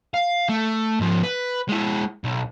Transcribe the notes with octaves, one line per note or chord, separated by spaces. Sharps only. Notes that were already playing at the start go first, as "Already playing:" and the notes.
F5
A3
G#2 F3
B4
G#3 E4
B1